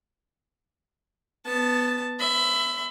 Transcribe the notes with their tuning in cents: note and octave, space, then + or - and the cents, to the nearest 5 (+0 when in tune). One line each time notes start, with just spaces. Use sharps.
B3 +0 A5 +0
E5 +10 B5 +30